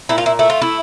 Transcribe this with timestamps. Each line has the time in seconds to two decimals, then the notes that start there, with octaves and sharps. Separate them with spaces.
0.09 A#2 E4
0.18 F4
0.26 E4
0.39 A3 E4
0.50 F4
0.62 E4